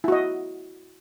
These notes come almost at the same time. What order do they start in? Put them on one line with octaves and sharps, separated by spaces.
E4 F#4 D#5